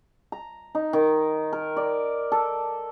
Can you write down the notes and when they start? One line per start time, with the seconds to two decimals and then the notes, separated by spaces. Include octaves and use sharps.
0.32 A#5
0.75 D#4
0.93 D#3
1.53 A#4
1.77 D5
2.32 A4